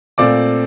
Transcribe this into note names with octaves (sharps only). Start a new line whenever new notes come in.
A#2 A3 C4 F4 D5 D6